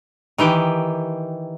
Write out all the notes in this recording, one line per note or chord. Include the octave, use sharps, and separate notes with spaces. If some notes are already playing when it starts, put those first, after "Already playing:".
D#3 E3 G4